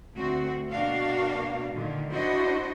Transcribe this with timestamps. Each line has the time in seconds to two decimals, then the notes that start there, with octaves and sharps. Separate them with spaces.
0.16 D2 A3 C4 F#4
0.71 B2 A#3 D4 F#4 F5
1.72 A#2 D3 D#3
2.13 D4 E4 F#4 C5 D#5